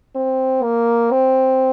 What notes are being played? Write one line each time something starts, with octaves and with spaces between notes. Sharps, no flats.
C4
A#3
C4